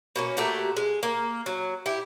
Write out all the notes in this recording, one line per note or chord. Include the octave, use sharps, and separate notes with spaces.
B2 A#3 C#4
A#2 A3 F#4 G4
G#3
A#3
F#3
E4 G4